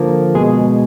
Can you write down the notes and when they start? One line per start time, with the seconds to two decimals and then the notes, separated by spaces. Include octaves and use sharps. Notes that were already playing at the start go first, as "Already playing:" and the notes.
Already playing: D3 F3 A#3
0.35 B2 G#3 G#4